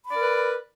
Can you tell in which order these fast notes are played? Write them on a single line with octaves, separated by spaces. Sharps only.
B5 D5 A#4 B4